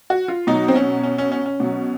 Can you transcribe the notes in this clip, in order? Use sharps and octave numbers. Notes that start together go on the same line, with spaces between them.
F#4
F4
B2 F#3 D#4
C4
C#4
C#4
C#4
C#4
C#4
B2 F#3